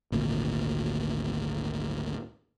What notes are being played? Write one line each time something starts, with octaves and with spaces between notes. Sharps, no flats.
G#1 D2 A#2